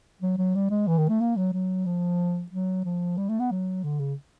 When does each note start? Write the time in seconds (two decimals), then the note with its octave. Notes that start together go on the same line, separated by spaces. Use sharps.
0.21 F#3
0.38 F#3
0.55 G3
0.71 G#3
0.88 E3
0.98 D#3
1.09 A3
1.21 A#3
1.37 F#3
1.53 F#3
1.86 F3
2.51 F#3
2.85 F3
3.17 G3
3.29 A3
3.39 B3
3.51 F#3
3.84 D3
3.99 C#3